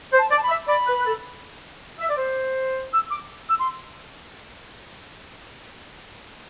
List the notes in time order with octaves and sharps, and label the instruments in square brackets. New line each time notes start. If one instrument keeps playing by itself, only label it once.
[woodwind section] C5
[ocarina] A5
[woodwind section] D5
[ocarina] A5
B5
[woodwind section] E5
[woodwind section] D5 [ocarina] B5
[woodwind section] B4
B4
A4
E5
D5
C5
[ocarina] E6
D6
E6
C6